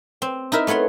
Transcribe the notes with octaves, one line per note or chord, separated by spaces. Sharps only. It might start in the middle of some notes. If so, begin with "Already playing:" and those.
C4
D#4 E4 A#4 E5
A3 B3 C#5 F#5 C6